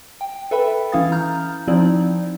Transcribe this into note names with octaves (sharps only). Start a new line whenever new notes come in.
G5
A4 B4 E5 G5 B5
E3 C#4 E4 F5 D#6 A6
A#5 F6 G6
F3 C4 D#4 E4 D5